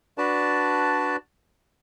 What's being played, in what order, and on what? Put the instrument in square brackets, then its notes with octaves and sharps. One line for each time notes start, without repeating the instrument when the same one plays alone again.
[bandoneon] D4 F#4 B4 D5 A5